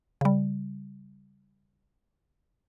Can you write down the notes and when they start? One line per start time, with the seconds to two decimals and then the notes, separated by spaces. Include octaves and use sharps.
0.21 C#3 G3